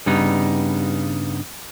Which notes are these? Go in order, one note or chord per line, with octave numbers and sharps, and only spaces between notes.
G2 C#3 G3 B3 D#4